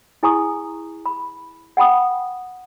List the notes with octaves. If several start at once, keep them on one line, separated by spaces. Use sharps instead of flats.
E4 G#4 G#5 A#5 C#6 D#6
B5
F#5 G5 B5 D#6